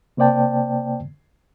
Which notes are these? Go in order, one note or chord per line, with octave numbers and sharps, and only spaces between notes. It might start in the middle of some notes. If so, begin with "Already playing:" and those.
C3 A#3 C5 D5 G5 A5